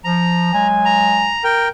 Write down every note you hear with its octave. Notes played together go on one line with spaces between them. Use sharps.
F3 A#5
F#3 G#3 G#5
A#5
A#4 G5